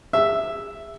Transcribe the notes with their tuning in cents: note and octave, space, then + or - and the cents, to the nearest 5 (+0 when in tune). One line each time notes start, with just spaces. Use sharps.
G#4 -30 E5 +0